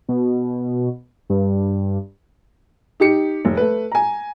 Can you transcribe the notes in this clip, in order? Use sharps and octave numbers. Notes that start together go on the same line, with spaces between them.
B2
G2
D#4 G4 C#7
F1
A3 B4
G#5 A#5